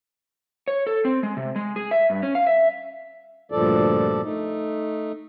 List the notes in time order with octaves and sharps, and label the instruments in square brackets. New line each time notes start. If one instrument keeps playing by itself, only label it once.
[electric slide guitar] C#5
A4
C4
G#3
C3
G#3
G#4
E5
G2
C#4
F5
E5
[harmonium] D2 G2 A#2 F3 A4 D5
A3 D#4